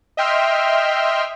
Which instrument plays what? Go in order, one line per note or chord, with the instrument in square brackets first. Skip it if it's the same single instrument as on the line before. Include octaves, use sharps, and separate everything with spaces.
[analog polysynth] D#5 E5 G5 C6 F6